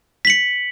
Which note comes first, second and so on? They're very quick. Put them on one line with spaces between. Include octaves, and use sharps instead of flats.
B6 F#7 C#7